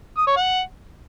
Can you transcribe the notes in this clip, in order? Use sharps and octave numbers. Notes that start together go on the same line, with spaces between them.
D#6
C#5
F#5